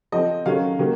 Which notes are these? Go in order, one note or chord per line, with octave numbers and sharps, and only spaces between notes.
F3 C4 D#5
D#3 F#3 C#4 F5
D#3 F#3 A#3